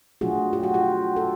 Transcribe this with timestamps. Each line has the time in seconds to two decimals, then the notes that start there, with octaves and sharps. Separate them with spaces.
0.21 B2 F#3 A3 D4 F4 F#4 G#4
0.53 F4 G4
0.63 F#4
0.74 F4 G4
1.16 G4 A4